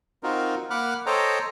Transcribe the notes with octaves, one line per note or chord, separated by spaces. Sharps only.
C4 D#4 F4 F#4 A#4
A#3 F#5 B5 D6 F6 F#6
A4 C5 C#5 D#5 G5 A#5